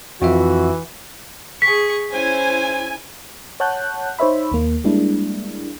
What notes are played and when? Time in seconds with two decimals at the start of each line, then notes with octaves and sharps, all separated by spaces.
0.22 F2 E3 F4 F#4 E5
1.62 G#4 C#6 B6
2.11 C#4 E4 C5 G#5
3.60 C#5 F#5 A5 F#6 G6
4.19 D#4 C5 C#5 E5 B5
4.52 D#2 A#3
4.84 G3 G#3 A#3 D4 E4